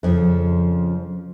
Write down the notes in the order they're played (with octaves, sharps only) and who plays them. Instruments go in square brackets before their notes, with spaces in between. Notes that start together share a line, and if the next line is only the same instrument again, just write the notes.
[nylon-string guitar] F2 C#3 F3